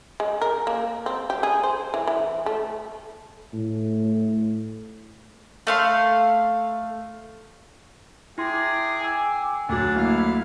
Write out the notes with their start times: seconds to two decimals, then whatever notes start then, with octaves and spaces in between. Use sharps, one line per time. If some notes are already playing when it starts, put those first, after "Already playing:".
0.20 G#3
0.41 A#4
0.67 A#3
1.06 C4
1.30 G4
1.43 G#4
1.63 C5
1.94 E3
2.07 E3
2.46 A3
3.53 A2
5.67 A3 F5 C6
8.38 E4 G#4 G5 C6 D6
9.01 G#5 E6
9.69 D2 F#3 D4
9.96 A#3 E4 F5